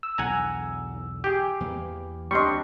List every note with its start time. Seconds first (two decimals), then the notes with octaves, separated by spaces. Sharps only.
0.03 E6
0.18 B1 E2 D3 F#5 G#5 A#5
1.24 G4 G#4
1.60 E2 E3 A#3
2.31 D2 G3 C4 D4 D#5 C6 C#6